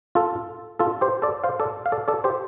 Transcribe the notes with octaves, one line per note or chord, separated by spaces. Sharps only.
F4 A4
F4 A4
G4 C5
A4 D5
C5 F5
A4 D5
F5
A4 D5
A4 D5
G4 C5